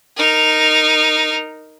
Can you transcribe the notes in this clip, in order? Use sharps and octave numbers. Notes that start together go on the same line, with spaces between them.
D#4 A#4